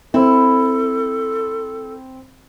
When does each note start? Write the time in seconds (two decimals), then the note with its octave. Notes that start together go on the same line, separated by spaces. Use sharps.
0.14 C4 E4 A4